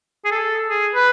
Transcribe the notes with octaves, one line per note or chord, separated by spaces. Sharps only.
G#4
A4
G#4
B4